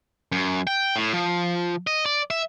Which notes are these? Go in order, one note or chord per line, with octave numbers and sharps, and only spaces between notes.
F#2
G5
A2
F3
D#5
D5
E5